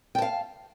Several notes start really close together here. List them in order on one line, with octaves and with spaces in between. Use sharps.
G5 A5 F5